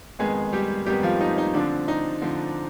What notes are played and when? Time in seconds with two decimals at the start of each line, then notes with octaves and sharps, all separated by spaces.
0.19 F2 D#3 G#3 B3 G#4
0.53 G3 G4
0.86 F2 D#3 G3 B3 G4
1.03 F3 F4
1.21 D#4
1.38 D#4
1.54 D3 F3 C4 D4
1.88 D#4
2.22 D3 F3 C4